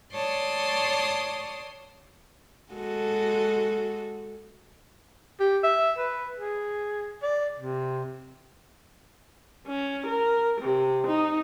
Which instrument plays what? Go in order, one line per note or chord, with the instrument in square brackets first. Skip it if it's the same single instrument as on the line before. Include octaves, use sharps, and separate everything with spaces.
[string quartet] C#5 D5 A5 C6 D#6
[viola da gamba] G#3 F#4 A4
[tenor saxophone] G4
E5
B4
G#4
D5
C3
[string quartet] C#4
A#4
C3
D#4